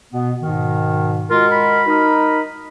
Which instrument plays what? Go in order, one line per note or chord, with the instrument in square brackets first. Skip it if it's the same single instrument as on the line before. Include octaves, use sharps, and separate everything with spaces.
[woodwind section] B2 B3
G#2 B2 D#3
[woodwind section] G#3 F#4 A#4 [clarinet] F4
[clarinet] B5
[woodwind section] D#4 A#4